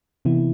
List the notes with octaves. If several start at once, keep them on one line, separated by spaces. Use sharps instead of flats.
C3 E3 B3 E4